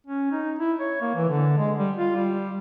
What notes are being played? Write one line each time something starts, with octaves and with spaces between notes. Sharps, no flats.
C#4
D#4
E4
C#5
A#3
E3
D3
G#3
G3
F4
G3